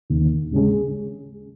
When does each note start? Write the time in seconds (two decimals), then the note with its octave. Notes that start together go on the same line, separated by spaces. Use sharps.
0.10 D#2
0.52 C#3 G#3 C#4 G#4